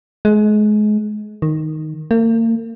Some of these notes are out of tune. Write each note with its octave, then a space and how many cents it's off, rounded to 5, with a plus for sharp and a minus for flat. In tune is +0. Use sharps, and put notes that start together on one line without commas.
G#3 +30
D#3 +0
A#3 -40